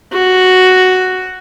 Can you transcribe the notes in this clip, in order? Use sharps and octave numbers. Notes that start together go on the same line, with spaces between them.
F#4